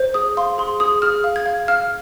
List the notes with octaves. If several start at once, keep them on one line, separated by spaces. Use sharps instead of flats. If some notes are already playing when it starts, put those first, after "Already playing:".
Already playing: C5
G#4 D#6
F5 C6
G#4 C6
G#4 D#6
G#4 F6
F5
G#6
F5
F5 F6